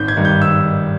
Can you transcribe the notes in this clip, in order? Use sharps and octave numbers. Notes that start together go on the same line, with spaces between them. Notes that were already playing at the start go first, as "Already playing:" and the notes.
Already playing: G#1 G6
G#6
G2 D#3
G6
E6